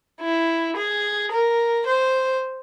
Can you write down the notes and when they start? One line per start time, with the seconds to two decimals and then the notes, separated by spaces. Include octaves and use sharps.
0.21 E4
0.76 G#4
1.31 A#4
1.86 C5